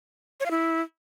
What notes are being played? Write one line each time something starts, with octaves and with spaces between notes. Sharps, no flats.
C#5
F5
E4